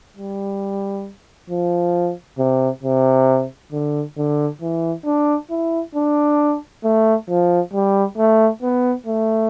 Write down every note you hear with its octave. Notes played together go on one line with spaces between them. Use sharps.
G3
F3
C3
C3
D3
D3
E3
D4
E4
D4
A3
F3
G3
A3
B3
A3